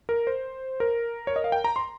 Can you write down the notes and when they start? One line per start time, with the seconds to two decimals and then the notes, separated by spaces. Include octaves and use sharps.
0.09 A#4
0.27 C5
0.80 A#4
1.27 C#5
1.36 D#5
1.44 F5
1.52 G5
1.64 A#5
1.76 C6